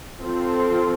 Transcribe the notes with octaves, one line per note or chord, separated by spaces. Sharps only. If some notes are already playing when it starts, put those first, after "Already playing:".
F3 C4 F4 A4